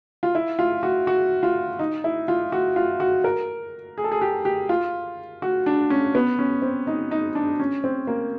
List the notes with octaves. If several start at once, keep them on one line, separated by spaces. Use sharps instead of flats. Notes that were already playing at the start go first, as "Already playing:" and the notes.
F4
E4
F4
F#4
F#4
F4
D#4
E4
F4
F#4
F4
F#4
A#4
G#4
A4
G#4
G4
G4
F4
F#4
D4
C#4
B3
C#4
C4
D#4
D#4
D4
C#4
C4
A#3